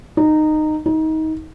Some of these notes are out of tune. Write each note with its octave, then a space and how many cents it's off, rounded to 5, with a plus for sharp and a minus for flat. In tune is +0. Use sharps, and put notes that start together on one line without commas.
D#4 -15
D#4 +25